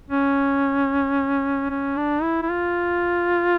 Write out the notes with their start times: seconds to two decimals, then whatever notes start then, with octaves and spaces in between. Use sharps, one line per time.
0.11 C#4
1.70 C#4
1.97 D4
2.22 E4
2.43 E4
2.50 F4